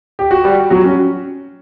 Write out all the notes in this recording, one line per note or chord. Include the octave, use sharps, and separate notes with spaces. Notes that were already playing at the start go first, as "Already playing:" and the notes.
G4
F#4
G3 G4
F#3 F#4
C#4